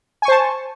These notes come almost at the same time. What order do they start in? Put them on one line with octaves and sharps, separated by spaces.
G#5 C#6 C5 A5